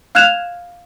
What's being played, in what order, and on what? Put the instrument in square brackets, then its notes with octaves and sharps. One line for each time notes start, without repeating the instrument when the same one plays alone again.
[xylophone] F5 F6 F#6 G#6 E7 F7